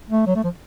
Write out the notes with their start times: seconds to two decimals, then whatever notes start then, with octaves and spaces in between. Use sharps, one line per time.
0.10 A3
0.27 F#3
0.36 A3
0.44 F3